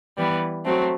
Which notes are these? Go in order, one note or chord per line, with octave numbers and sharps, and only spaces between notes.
E3 G3 B3
F#3 A3 C4